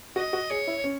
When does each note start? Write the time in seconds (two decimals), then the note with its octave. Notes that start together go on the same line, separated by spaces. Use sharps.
0.16 F#4 D#5
0.33 F#4
0.50 G#4 C#5
0.67 E4
0.84 C#4